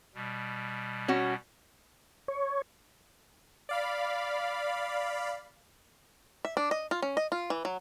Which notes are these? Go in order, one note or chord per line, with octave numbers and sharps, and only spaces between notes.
B2 G3
C#4 F#4
C#5
D5 F5 B5
E5
D4
D#5
F4
C#4
D#5
F4
E3
F#3